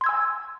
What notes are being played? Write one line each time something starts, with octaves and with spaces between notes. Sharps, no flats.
G#5 C6 E6 G#6